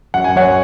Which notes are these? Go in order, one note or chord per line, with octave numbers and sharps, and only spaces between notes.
F#2 F#5
G#5
F#2 C#5 F#5